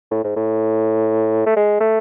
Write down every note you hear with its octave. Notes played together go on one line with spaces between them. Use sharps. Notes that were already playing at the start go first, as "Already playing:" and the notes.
A2
G#2
A2
A3
G#3
A3